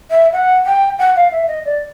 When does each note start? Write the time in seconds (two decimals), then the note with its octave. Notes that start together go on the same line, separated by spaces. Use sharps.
0.11 E5
0.33 F#5
0.66 G5
0.99 F#5
1.16 F5
1.32 E5
1.48 D#5
1.65 D5